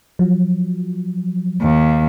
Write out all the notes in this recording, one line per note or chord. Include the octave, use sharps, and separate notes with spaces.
F3 F#3
D#2